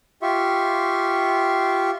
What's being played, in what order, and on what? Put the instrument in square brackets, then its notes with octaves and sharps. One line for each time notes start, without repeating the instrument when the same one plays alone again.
[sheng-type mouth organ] F4 G4 E5 C6 C#6